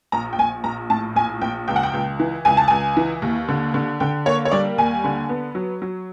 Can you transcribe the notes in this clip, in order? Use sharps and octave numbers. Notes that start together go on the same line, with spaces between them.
A#1 A#5
G5
A#1 G#5
A#1 A#5
A2 A5
A#1 G#5
A#1 G5
C#2 G5
F#5
G5
C#2
E3
C#2 G#5
A5
C#2 G#5
E3
D#2
D3
D3
D3 G5
A#3 C#5
C#5
G3 D5
D#2 G#5
D3
B3
F#3
F#3